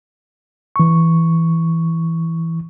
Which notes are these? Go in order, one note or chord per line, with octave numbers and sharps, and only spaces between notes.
E3 C#6